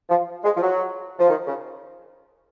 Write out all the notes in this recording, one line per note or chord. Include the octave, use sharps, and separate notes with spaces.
F3
G#3
F3
F#3
F3
D#3
C#3